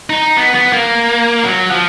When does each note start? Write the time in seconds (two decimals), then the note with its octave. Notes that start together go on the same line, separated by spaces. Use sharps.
0.10 D#4
0.37 B3
0.55 B3
0.73 A#3
1.44 F#3
1.71 F3